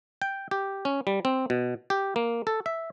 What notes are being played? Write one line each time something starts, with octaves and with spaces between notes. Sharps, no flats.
G5
G4
C#4
G3
C4
B2
G4
A#3
A4
E5